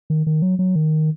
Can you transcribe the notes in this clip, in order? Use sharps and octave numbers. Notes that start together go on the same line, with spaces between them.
D#3
D#3
F#3
F#3
D#3